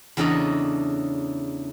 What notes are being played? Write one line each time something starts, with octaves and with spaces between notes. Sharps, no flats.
E2 C#3 D4 A4 D#5 A#5